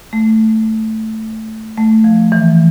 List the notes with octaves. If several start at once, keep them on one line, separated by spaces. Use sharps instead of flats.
A3
A3
F3
E3